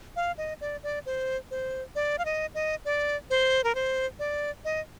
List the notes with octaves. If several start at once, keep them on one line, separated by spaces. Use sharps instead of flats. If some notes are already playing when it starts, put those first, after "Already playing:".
F5
D#5
D5
D5
C5
C5
D5
F5
D#5
D#5
D5
C5
A#4
C5
D5
D#5